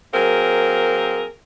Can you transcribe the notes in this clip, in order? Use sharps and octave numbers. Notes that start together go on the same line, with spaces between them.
F#3 A#3 C4 G#4 A#4